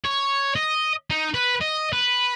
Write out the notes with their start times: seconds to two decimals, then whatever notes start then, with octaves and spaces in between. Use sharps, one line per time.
0.04 C#5
0.55 D#5
1.10 D#4
1.34 B4
1.61 D#5
1.93 B4